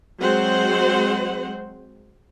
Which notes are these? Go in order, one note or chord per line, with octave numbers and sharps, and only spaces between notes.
F#3 G#3 C4 C5 F#5